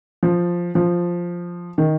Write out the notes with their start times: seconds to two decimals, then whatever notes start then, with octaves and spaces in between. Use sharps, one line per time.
0.23 F3
0.75 F3
1.78 D#3